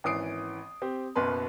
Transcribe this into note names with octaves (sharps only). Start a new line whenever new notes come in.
G#1 E3 C#4 D#6 C7 D7
C4 G4
F#1 F#2 B2 B4 C6